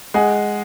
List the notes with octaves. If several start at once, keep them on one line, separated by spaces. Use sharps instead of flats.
G#3 F#5 G#5